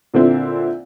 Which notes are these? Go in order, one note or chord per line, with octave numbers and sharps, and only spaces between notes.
A#2 D3 C4 E4